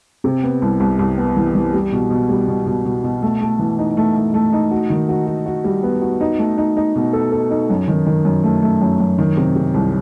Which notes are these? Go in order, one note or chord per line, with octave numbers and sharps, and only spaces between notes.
C3
B3
C2
C2
C2
B3
E3
E3
G3
B2
B2
G3
B2
B2
B2
B2
A3
A3
E3
D#4
A3
A3
A3
D#4
F#4
D#3
F#4
F#4
F#4
G3
B3
F#4
D#4
A3
D#4
D#4
B2
A4
A4
D#4
F#2
D#3
D#3
F#2
A3
A3
F#2
F#2
D#3
C3
C3
C2